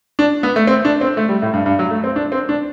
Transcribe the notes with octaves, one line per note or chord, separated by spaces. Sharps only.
D4
B3
A3
C4
D4
C4
A3
G3
A2
G2
G2
F#3
A3
C4
D4
C4
D4